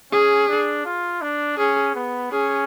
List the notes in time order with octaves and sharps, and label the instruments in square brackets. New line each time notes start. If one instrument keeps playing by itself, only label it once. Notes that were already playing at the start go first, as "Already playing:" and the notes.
[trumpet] C#4 [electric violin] G#4
[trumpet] D4
F4
D4
[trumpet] C#4 [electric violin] G#4
[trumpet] B3
[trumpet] C#4 [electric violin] G#4